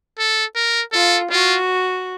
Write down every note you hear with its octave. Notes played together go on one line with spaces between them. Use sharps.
A4
A#4
F4 A4
F4 F#4